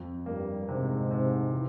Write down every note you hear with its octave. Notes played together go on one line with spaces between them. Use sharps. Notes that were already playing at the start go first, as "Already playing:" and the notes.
Already playing: F2
G2 A#3
G#2 C3
C3
E3